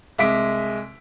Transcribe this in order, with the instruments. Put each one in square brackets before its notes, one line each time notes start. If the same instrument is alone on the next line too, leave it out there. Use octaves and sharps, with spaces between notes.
[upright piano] C2 G#3 E5 D6 B6 D7